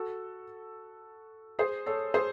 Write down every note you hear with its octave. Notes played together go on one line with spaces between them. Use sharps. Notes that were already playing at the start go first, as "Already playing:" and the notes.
Already playing: F#4 A4
G#4 C5
A4 C#5
G#4 C5